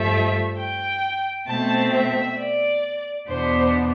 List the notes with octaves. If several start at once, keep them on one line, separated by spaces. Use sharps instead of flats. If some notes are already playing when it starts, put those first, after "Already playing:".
Already playing: G2 F3 A3 E5
G5
B2 A3 C4 A5
E5
D5
E2 B2 B3 D4 C5